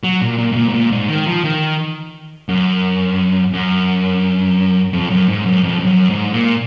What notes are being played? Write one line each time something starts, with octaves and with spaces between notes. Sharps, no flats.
F#3
A#2
A#2
G#2
A#2
G#2
A#2
G#2
D#3
F3
D#3
F#2
F#2
F2
F#2
G#2
F#2
F2
F2
F#2
G#2
A#2